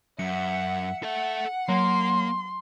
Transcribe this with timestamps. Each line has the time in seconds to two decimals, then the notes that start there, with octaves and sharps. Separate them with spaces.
0.19 F#2 E5 F#5 C#7
1.03 A4 E5 F#5
1.69 F#3 A#3 C6